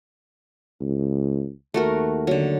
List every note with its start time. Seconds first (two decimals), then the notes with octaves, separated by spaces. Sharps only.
0.81 C#2
1.74 D#2 A3 F#4 A#4
2.27 D3 F#3